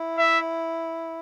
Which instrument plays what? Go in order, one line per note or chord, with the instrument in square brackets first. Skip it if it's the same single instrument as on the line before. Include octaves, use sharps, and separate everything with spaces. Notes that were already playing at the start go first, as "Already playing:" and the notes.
Already playing: [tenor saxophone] E4
[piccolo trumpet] E5